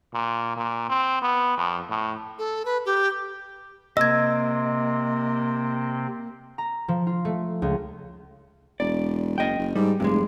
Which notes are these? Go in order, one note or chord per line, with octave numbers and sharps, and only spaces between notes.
A#2
A#2
C4
B3
F2
A2
A4
B4
G4
C3 A#3 C4 D#5 E6 G#6
A#5
F3
F4
A3
C#2
E1 D5
F#1 D#5 G5
F#1
G#2 G3
F1 G2 G#3